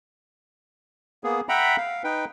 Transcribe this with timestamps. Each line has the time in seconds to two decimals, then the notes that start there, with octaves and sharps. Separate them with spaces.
1.24 A#3 B3 G#4
1.49 E5 F#5 G5 A#5 B5
1.77 F5
2.04 D#4 B4 G5